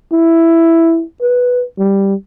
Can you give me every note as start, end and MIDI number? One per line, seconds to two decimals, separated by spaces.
0.12 1.03 64
1.22 1.64 71
1.78 2.14 55